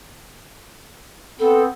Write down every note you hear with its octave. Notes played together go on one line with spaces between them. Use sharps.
B3 C4 A4